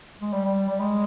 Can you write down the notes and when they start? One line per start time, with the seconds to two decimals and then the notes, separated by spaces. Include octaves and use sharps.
0.21 G#3
0.33 G3
0.45 G3
0.69 G3
0.80 G#3